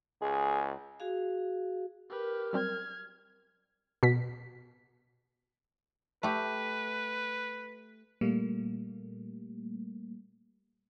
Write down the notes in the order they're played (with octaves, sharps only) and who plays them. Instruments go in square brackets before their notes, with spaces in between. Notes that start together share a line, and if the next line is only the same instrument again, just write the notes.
[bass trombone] C#2 [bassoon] G#4
[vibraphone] F#4 G#4 F5
[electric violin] G4 B4 [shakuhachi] A#4
[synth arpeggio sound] F#3 G3 C4 [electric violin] F6 G#6
[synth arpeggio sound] B2 B6
[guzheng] A3 G4 [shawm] B4
[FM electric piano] A#2 G3 A3 A#3